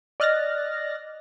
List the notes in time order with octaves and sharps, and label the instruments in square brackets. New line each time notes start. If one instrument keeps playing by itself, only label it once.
[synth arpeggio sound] D5 D#5 F6 F#6 A6 A#6